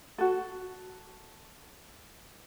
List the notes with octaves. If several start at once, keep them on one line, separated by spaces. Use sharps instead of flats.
F#4 A4